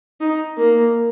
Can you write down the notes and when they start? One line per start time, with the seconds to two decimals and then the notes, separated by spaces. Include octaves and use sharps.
0.21 D#4
0.58 A#3